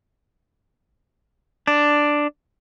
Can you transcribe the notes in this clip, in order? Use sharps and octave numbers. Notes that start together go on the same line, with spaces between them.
D4